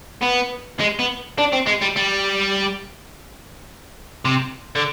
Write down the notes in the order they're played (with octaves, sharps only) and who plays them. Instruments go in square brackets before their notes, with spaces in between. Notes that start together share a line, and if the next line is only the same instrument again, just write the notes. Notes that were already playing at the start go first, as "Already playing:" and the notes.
[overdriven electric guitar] B3
G#3
B3
D4
C4
G#3
G3
G3
C3
D3